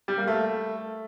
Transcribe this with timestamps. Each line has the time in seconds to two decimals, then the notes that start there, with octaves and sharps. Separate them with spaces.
0.08 G3
0.18 A#3
0.27 A3